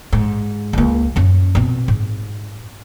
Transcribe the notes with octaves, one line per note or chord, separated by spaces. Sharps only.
G#2
C#2 A#3
F#2 C#4
B2 C4
G#2